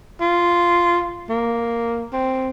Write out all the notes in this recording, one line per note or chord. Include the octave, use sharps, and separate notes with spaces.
F4
A#3
C4